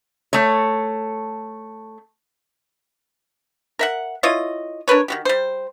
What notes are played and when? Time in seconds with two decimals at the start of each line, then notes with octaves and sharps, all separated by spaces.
0.33 A3 C#5
3.79 A#4 E5 F#5
4.23 E4 F4 C#5 D#5
4.88 D4 A#4 B4 C#5
5.08 D#3 F#4 G4
5.25 G3 C5